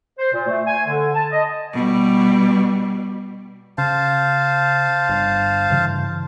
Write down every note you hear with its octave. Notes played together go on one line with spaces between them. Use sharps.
C5
A#2
A3
G#5
D3
A5
D#5
B2 G3
C#3 C5 F5 A5
G1
G2 C#3 E3